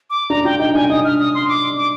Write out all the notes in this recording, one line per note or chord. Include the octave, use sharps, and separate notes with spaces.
D6
D4 A#5
F4 G5
D#4 G5
D4 G#5
D#4 D#6
F6
D#6
C6
D6
D6